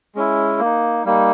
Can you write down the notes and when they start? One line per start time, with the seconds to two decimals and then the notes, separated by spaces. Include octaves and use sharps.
0.15 G#3 C#4 E4
0.59 A#3
0.64 D#4
1.05 G3 A#3 D#4